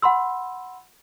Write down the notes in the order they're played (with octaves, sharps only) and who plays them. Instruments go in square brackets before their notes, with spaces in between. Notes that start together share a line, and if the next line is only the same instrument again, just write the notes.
[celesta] F#5 B5 C6 E6